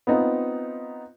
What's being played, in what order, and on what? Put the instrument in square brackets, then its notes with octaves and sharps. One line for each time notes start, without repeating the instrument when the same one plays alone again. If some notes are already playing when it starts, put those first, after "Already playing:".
[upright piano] B3 C4 D#4 F4